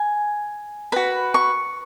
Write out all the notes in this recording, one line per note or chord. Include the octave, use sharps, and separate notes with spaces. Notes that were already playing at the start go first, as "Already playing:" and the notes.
Already playing: G#5
F#4 B4 B5
C#6